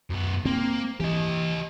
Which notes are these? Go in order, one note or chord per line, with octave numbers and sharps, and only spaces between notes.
F#2 B3
A#3 C4
E3 G4 D#5